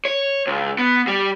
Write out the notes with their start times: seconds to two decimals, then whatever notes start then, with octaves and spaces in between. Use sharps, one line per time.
0.05 C#5
0.47 C#2
0.78 B3
1.07 G3